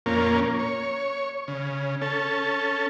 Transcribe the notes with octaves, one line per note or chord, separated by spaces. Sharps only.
F2 A#2 A#3 C#4
C#5
C#3
C#4 A4